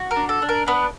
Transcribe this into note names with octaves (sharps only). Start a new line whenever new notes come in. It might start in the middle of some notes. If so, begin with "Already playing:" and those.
Already playing: F#4
A#4
D4
A4
D4
A#4
B3 D4 B4